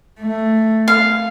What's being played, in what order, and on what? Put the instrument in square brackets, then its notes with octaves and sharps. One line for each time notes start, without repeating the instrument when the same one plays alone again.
[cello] A3
[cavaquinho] F5